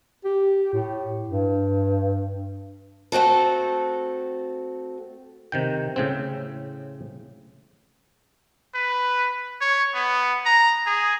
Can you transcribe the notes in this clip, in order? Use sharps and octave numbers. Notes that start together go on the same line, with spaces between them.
G4
A2
G2
A3 C4 F#4 A4
C3 D#3 G5
A2 C#3 C4
B4
C#5
B3
A#5
G#4